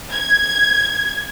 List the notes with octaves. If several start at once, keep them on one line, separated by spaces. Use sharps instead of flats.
G#6